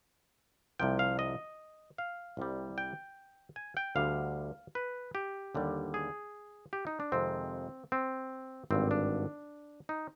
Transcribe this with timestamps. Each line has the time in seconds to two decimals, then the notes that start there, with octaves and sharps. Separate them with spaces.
0.79 C2 C3 F3 G5
0.99 F5
1.19 D#5
1.98 F5
2.37 C2 C3 G3
2.78 G5
3.56 G#5
3.77 G5
3.96 D2 D3 G3 F5
4.75 B4
5.15 G4
5.55 D#2 D3 G3
5.94 G#4
6.73 G4
6.87 D#4
7.00 D4
7.12 F2 C3 D#3 G#3 C4
7.92 C4
8.71 G#1 G2 D3 C4
8.91 D4
9.89 D#4